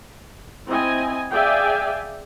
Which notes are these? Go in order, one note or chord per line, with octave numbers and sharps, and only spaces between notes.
C4 E4 D#5 G#5
G#4 D5 E5 F5 G5 G#5